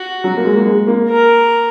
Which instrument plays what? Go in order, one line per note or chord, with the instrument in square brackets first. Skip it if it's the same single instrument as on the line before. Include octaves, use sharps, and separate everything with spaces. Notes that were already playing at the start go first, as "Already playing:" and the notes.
Already playing: [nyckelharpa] F#4
[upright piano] F#3
A#3
G#3
A#3
G#3
A#3
[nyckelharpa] A#4